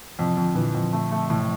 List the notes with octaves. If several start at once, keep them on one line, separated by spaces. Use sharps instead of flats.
F2 C3 E3
F2 D3 F3
A#2 D3 E3
F2
A3
A3
A2 C3 E3